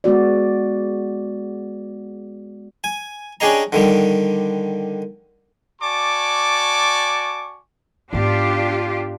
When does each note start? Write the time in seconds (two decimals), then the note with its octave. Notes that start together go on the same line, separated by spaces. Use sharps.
0.04 G#3 B3 F#4 D5
2.84 G#5
3.40 C#4 D4 G4 G#4 D#5 A#5
3.72 D3 D#3 G3
5.82 F#4 D5 G#5 A5 C#6 D6
8.13 G#2 B3 D4 F4 G4